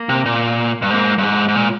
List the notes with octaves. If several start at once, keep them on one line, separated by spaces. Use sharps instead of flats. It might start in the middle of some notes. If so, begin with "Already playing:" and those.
Already playing: A#3
C3
A#2
G2
G#2 A#3
G2
G#2 G#3
G#2
A#2